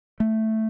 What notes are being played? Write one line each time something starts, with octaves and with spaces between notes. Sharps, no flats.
A3